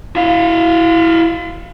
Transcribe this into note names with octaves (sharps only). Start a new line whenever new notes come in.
E4 F5